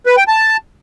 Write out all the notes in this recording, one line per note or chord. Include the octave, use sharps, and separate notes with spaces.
B4
G5
A5